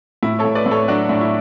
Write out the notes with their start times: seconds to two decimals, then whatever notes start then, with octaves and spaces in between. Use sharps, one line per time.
0.23 A2 E4
0.39 A4 C#5
0.45 A2
0.55 B4 D5
0.66 A2
0.71 A4 C#5
0.88 F#3 D4 F#4
1.09 A2 D4
1.21 E4